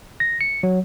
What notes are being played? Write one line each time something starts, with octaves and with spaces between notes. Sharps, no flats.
A#6
C#7
F#3